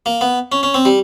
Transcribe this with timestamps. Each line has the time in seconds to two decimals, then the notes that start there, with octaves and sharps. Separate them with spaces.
0.06 A#3
0.21 B3
0.52 C#4
0.63 C#4
0.74 C4
0.85 G3